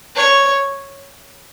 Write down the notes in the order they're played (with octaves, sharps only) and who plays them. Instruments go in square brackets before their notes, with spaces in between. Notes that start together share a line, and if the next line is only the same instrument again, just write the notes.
[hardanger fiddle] C#5